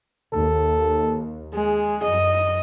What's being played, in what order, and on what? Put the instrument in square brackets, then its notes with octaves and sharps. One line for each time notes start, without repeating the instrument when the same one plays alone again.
[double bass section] D#2 [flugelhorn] A4
[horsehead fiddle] G#3 [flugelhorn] G#4
[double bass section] F#2 [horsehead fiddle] D#5